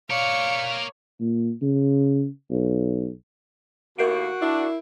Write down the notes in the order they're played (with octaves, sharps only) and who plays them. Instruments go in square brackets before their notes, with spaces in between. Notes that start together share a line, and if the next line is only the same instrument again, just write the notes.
[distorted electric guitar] A#4 D5 [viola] C#5 [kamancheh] F5 [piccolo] C#7
[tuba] A#2
C#3
B1
[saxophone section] D#2 A2 A#3 [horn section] F#4 [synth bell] A#4 C7 D7
[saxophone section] D4 [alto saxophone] E4